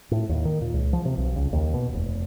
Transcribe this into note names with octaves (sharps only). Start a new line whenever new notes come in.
A2
D#2
D#3
A#2
C#2
F3
C3
B1
C#2
D#2
B2
F1